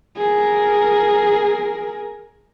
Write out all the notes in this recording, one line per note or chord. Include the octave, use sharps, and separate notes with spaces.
G#4 A#4